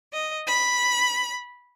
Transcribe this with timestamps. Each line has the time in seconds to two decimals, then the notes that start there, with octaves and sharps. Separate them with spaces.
0.13 D#5
0.46 B5